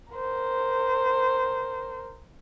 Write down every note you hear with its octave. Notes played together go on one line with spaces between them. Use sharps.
A#4 C5